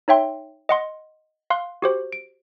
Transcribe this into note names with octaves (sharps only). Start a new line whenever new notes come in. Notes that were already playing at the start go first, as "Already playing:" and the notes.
D#4 C#5 E5 G5 C6
D#5 F#5 C6
F5 C6 F#6
F#4 G4 C5
D7